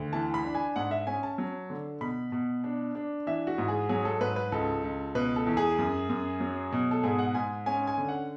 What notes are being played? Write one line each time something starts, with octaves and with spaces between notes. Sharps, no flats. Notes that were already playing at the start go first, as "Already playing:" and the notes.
Already playing: D2
E3 A5
B5
D4
G#5
G#2 F#5
E5
C#4 G#5
A5
F#3
D3
B2 B5
B2
D4
D4
E3 E5
F#4
G#2
G#4
F#3 G#4
A4
G#2 B4
B4
C#2 A4
C#2
B2 B4
A4
E2
G#4
F#2
F#2
F#3
B2
A4
G#2 G#4
F#5
G#2 G#5
C#4 G#5
G#5
D3
F#5